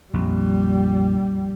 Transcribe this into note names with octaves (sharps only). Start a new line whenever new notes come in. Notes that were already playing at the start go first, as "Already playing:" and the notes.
A#1 F2 G3